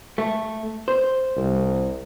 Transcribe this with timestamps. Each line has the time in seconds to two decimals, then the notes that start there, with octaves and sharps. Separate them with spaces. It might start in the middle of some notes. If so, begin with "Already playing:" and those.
0.18 A3
0.88 C5
1.37 C2